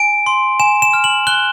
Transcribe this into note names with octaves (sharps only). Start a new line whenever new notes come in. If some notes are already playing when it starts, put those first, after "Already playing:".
Already playing: G#5 D7
C6
G#5 E7
E7
F6
F#7
F#6 G7